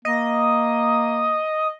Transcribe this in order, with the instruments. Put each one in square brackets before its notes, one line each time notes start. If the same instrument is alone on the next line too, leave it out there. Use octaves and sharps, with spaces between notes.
[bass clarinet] A#3 [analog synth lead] D#5